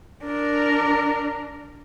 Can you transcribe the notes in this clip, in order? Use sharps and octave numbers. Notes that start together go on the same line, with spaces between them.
D4 A#4